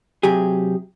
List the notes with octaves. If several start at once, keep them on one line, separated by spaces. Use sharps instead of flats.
C3 F#3 G4 G#4